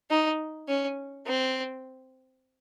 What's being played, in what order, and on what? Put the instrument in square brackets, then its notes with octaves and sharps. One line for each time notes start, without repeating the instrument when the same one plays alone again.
[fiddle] D#4
C#4
C4